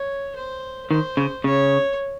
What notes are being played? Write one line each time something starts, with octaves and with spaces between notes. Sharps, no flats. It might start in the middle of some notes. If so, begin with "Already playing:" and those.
Already playing: C#5
C5
D#3 C5
C#3
C#3 C#5